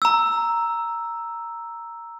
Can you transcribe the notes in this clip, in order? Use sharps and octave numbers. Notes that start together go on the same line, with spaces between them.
A#5 E6